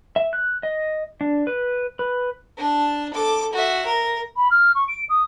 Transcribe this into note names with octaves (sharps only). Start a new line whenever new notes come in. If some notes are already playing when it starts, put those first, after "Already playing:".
E5
F#6
D#5
D4
B4
B4
D4 A5
A4 D6
F#4 E5
A#4
B5
F6
C#6
D7
D#6